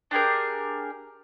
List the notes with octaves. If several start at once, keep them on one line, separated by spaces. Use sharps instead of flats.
D4 G4 G#4 A#4